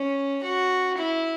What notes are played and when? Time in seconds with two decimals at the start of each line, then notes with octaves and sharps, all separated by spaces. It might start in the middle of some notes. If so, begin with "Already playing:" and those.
Already playing: C#4
0.43 F#4
0.98 E4